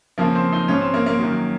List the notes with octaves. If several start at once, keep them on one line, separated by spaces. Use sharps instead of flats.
F2 C#3 F3 A#3
C4
D#4
G#2 F3 C#4
C4
A#3
A#3
F#2 D#3 F#3